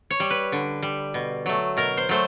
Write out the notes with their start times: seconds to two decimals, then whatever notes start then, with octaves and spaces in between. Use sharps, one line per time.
0.10 C#5
0.20 G3
0.30 B4
0.52 D3
0.83 G3
1.14 B2
1.46 F#3 A3
1.77 B2 A#4
1.97 C5
2.09 F#3 A3 C5